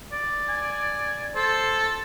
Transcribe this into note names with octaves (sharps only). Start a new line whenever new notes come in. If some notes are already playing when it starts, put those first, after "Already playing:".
D5
G#5
A4 C5